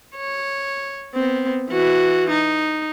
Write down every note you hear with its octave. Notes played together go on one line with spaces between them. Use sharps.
C#5
B3 C4
E3 F#4
D#4